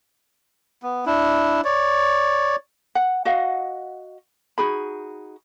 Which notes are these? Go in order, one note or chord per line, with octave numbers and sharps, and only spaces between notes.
B3
D4 E4
C#5 D5
F#5
F#4 D#5 F5 F#5
D#4 F#4 G#4 B5